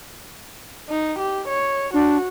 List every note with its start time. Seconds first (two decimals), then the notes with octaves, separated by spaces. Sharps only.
0.89 D#4
1.19 G4
1.48 C#5
1.94 D4 F#4